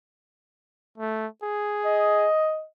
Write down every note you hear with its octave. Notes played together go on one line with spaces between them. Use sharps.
A3
G#4
D#5